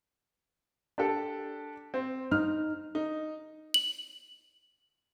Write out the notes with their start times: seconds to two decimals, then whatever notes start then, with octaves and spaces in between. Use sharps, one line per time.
0.98 D4 G4 A4
1.94 C4
2.31 D#4 F6
2.95 D#4
3.74 F#7